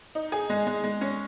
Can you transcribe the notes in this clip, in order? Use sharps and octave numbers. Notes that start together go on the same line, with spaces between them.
D#4
G#4
G#3
G#3
G#3
C#4